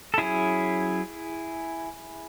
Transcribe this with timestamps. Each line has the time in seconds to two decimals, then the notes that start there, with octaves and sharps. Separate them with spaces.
0.14 A4
0.18 F#3 C#4 E4 G#4